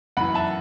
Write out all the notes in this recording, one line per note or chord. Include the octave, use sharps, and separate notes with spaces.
F#2 E3 F#5 B5
E5 A5